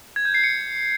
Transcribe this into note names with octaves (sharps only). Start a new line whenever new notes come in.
G#6
G6
C7
C#7